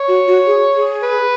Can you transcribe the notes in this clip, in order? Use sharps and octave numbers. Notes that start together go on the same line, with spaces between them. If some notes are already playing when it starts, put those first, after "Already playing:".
Already playing: C#5
F#4
F#4
G#4
G#4
B4